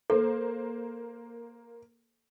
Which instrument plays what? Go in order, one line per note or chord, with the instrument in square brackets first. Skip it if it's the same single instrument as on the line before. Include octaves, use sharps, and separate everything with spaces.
[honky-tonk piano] A#3 C5 [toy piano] A4